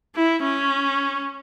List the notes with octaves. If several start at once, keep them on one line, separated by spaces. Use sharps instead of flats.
E4
C#4